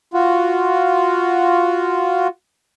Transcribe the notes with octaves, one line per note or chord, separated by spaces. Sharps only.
F4 F#4